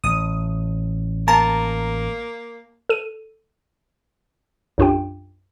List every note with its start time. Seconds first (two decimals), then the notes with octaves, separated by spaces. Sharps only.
0.04 A1 D#6
1.28 A#3 A5 A#5
2.89 A4 D#7
4.78 B1 F#2 D4 F4 G4 G5